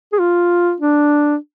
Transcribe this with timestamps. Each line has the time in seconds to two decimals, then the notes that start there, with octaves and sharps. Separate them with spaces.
0.13 G#4
0.19 F4
0.81 D4